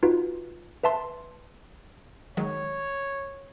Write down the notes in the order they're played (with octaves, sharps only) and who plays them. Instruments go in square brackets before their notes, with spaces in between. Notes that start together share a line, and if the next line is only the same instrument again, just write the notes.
[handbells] D#4 F4 F#4 B4
B4 E5 A5 C6
[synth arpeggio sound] D#3 F#3 G#3 [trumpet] C#5